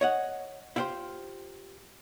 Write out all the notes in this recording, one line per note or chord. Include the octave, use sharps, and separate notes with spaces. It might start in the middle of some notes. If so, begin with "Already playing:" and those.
C#5 D#5 F#5
E4 F4 G4 C5 C6